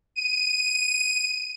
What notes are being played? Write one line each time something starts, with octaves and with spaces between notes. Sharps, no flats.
D#7